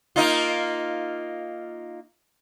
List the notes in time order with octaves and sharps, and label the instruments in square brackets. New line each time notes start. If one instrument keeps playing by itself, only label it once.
[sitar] A#3 D#4 F4